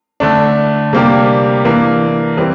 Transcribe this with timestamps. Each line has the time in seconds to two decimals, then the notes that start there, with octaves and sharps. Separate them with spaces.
0.20 D3 A3 D4
0.93 C3 G3 A#3 D4 G4
1.65 E3 A#3 D4
2.37 E3 G3 C4